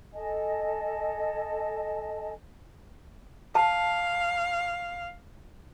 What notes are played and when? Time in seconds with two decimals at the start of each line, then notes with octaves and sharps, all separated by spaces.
0.15 A4 D#5 G#5 A5
3.55 F5 A5